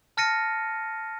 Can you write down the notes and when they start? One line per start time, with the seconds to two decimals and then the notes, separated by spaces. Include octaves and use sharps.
0.17 A5 F6 A6 A#6 C#7 D#7